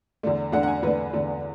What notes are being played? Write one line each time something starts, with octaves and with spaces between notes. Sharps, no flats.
E2 D3 A3 D4
E2 D3 A3 D4 F#5
F#5
G#5
E2 D3 A3 D4 B4
E2 D3 A3 D4